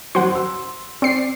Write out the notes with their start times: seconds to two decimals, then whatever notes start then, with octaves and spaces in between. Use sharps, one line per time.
0.15 F#2 F#3 C5 F#5
0.32 C6 E6
1.02 C4 D5 C7